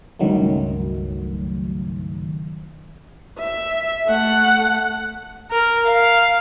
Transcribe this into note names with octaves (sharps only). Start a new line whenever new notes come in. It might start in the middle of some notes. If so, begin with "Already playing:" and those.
C#2 G2 D#3 F#3 A3
E5
A3 F#5
A#4
F5